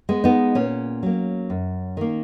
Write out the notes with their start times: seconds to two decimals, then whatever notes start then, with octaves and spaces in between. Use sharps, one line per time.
0.09 G#3 B3
0.24 B3 D#4
0.55 A#2 C#4
1.03 F#3 A#3
1.50 F#2
1.97 D#3 A#3